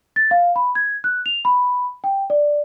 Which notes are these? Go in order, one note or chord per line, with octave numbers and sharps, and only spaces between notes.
A6
F5
B5
G#6
F#6
F7
B5
G5
D5